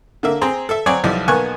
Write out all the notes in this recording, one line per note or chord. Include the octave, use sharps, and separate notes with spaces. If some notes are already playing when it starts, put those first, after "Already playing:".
D3 A#3 E5
C4 G#4 A#5 C6
A4 E5
F#3 C4 C#5 D5 G#5 D#6
B1 F3 G3 E4
B1 A#3 B3 G#5 C#6 F#6